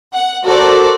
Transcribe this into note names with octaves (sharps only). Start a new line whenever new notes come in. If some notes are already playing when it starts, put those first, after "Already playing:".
F#5
F#4 A4 A#4 C5 D5